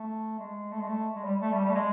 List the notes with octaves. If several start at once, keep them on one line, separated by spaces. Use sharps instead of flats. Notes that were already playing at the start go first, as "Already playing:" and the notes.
Already playing: A3
G#3
A3
G#3
A3
G#3
G3
A3
G3
G3
A3
G#3